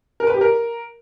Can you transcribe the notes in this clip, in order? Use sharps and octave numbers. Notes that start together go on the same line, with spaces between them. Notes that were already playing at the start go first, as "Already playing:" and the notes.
A#4
B4
G4
A#4